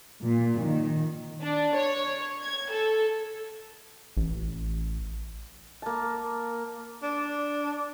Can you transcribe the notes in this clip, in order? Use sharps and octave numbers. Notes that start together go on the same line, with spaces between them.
A#2
D#3
D4
C#5
G#6
A4
A1
A#3 A5
D4